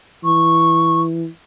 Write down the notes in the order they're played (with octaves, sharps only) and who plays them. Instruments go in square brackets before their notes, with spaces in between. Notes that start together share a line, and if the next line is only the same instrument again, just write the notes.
[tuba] E3 [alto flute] C#6